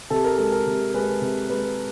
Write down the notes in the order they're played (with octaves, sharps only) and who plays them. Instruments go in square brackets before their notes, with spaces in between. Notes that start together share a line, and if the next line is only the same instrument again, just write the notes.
[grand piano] C3 A4
A#4
G#3 A4
A#4
C3
G#3 B4
C3
G#3 B4